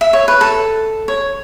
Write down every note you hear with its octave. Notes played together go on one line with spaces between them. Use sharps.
E5
C#5
B4
A4
C#5